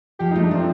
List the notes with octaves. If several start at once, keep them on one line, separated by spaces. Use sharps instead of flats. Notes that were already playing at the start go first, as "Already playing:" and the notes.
F3 G4
A3 D#4
D4
F3 C4